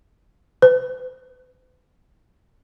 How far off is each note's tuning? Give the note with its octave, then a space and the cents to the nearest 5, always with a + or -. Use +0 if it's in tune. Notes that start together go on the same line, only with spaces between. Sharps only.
B4 +45